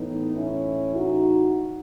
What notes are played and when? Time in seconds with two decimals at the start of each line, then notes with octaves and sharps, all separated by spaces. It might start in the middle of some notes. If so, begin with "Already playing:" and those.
Already playing: A2 E3 B3 D#4
0.36 C#4 E4
0.96 D#4 F#4